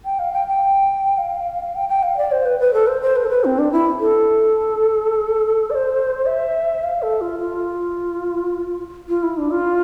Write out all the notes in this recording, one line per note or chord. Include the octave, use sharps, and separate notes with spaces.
G5
F5
G5
G5
F5
G5
G5
F5
D5
C5
B4
B4
A4
C5
C5
B4
A4
B4
C4
D4
E4
A4
D5
C5
E5
F5
A4
F4
F4
F4
E4
D4
F4